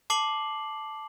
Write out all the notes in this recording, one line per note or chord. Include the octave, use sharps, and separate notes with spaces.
A5 D6 C7 F#7